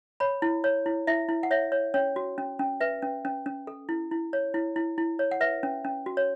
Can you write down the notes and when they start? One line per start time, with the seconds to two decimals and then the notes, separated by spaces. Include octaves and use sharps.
0.20 C#5 B5
0.42 E4
0.64 C#5
0.86 E4
1.07 E4 E5
1.29 E4
1.43 F#5
1.51 C#5 E5
1.72 C#5
1.94 C#4 C#5
2.16 F#4
2.38 C#4
2.59 C#4
2.81 B4 E5
3.02 C#4
3.25 C#4
3.46 C#4
3.67 A4
3.89 E4
4.11 E4
4.33 C#5
4.54 E4
4.76 E4
4.98 E4
5.19 C#5
5.31 F#5
5.41 B4 E5
5.63 C#4
5.84 C#4
6.06 F#4
6.17 C#5